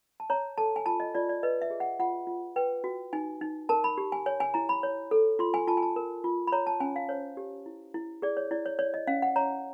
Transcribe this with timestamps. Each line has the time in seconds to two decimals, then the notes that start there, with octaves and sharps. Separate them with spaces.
0.20 A5
0.30 C#5 A#5
0.58 A4 A5
0.76 G#5
0.86 F4 A5
1.00 D#5
1.15 F4 D5
1.29 D5
1.43 B4 D#5
1.62 E5
1.71 G#4
1.80 F#5
1.99 F4 F#5
2.27 F4
2.56 B4 G5
2.84 F#4
3.13 D#4 G#5
3.41 D#4
3.69 A#4 A5
3.84 B5
3.98 G4
4.12 G#5
4.26 C#5 G#5
4.40 G#5
4.54 E4 A#5
4.69 B5
4.83 C#5
5.11 A4
5.39 F4 C6
5.54 G#5
5.67 F4 A5
5.77 G#5
5.82 A5
5.96 A#4
6.24 F4
6.47 B5
6.52 C#5 A#5
6.67 A5
6.80 C#4 G#5
6.96 F5
7.09 C5 C#5
7.37 G4
7.66 E4
7.94 E4
8.22 G#4 D5
8.37 C#5
8.51 E4 D5
8.66 C#5
8.79 C#5 D5
8.94 D#5
9.07 C#4 F5
9.22 F#5
9.36 C#5 A#5